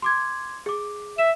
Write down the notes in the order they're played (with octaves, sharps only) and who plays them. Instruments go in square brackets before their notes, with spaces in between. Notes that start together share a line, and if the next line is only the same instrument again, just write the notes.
[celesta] C6 D6 G#6
G#4 D6
[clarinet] E5 [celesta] E7